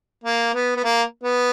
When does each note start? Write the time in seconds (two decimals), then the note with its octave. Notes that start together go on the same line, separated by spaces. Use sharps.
0.24 A#3
0.54 B3
0.77 B3
0.84 A#3
1.24 B3